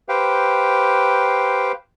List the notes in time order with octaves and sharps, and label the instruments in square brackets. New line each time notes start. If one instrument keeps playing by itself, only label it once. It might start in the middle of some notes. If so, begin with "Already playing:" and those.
[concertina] G4 B4 C5 F5 G5